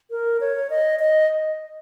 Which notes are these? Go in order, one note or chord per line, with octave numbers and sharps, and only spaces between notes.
A#4
C#5
D#5
D#5